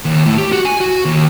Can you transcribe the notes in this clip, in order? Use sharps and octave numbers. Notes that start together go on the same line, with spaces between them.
D#2
A2
G4
F#4
G#5
F#4
D#2